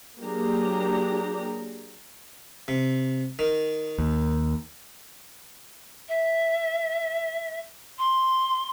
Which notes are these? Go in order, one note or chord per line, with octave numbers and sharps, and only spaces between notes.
F#3 A#3 D4 G4 G#4 A#5
C3
D#3
D#2
E5
C6